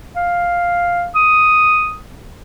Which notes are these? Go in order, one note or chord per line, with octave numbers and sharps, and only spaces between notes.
F5
D#6